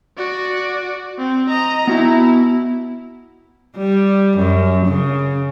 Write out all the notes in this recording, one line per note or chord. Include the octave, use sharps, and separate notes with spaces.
F#4 D5
C4
D#5 A#5
B3 E4 F#4 A#5
G3
F#2
C#3